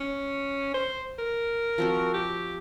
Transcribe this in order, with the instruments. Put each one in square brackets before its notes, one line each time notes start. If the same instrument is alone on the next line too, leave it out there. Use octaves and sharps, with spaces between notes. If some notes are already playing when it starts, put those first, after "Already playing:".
[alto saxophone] C#4
C5
A#4
[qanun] F3 C4 F#4
[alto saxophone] G4